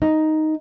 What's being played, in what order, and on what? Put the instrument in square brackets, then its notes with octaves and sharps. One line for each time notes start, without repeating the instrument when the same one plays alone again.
[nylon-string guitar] D#4